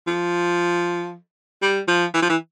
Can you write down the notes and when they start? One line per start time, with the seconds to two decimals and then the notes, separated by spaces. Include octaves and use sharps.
0.08 F3
1.62 G3
1.88 F3
2.14 E3
2.22 F3
2.30 E3